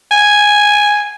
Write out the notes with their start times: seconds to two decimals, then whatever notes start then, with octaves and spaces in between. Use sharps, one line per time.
0.11 G#5